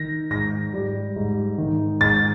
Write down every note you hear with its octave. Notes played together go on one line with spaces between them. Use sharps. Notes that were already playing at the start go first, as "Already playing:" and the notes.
Already playing: D#3 A#6
G#2 A#6
G3
G#2
D#3
G#2 A6